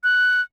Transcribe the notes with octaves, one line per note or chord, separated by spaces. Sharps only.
F#6